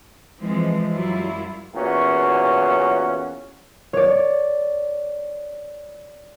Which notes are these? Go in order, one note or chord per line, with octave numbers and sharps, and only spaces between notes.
E3 F3 G#3 C4
F#2 F#3 G3 E4 F4
E2 A#2 C#4 F#4
C#5 D5